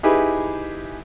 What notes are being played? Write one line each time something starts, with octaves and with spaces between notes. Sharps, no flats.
D#4 E4 G4 G#4 B4 E5